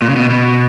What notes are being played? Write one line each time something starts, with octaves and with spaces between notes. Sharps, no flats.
A#2
C#3
B2
B2